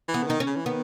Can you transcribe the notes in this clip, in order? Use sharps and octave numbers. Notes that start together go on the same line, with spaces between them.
E3
B3
C#3
D#3 D#4
C#4
C#3
E3
D#3 B3